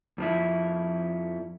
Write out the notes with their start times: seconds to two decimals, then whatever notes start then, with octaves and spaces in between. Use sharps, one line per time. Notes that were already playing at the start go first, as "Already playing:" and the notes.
0.18 F2 F3 E4